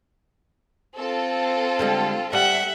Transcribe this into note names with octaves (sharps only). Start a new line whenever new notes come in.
C4 F4 A4
D3 G3 G#3
G3 E5 F#5